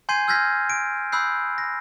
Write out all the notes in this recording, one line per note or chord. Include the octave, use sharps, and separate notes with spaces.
G#5 C6 G6 G#6 C7 D#7
E6 F6 G6 G#6 A#6 B6
D7
B5 D#6 E6 F#6 G6 C7
A#6